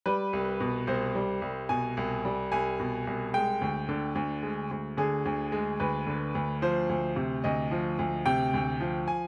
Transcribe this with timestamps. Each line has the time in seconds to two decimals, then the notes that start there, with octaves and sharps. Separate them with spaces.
0.06 G3 B4
0.33 C2
0.60 B2
0.87 C2 C5
1.15 G3
1.42 C2
1.69 B2 G#5
1.97 C2
2.25 G3
2.52 C2 G#5
2.80 B2
3.07 C2
3.34 G#3 G5
3.61 D2
3.89 D3
4.15 D2
4.43 G#3
4.71 D2
4.97 D3 G#4
5.25 D2
5.52 G#3
5.80 D2 B4
6.07 D3
6.35 D2
6.62 F3 C5
6.89 D2
7.16 C3
7.44 D2 D#5
7.71 F3
7.99 D2
8.26 C3 G5
8.54 D2
8.80 F3
9.08 G#5